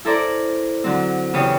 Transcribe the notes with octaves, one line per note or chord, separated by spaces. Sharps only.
E4 A4 A#4 C5 D5
D3 F#3 C4
E2 C#3 B3 G4 C#5 D#6